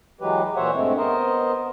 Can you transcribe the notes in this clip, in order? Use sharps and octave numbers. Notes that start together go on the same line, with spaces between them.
E3 F#3 G#3 G4 B4
A#2 E3 C5 C#5 E5 F#5
G2 G#3 A3 C4
B3 A#4 C5 D#5